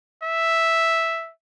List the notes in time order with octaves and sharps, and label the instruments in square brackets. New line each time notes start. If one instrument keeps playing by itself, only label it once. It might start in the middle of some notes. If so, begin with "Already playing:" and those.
[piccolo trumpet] E5